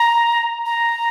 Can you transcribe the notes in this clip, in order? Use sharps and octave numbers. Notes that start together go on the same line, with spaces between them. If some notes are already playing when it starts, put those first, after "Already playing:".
Already playing: A#5
A#5